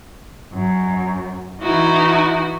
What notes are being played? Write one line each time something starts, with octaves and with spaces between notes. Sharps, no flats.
F#2
E3 D#4 E4 F#4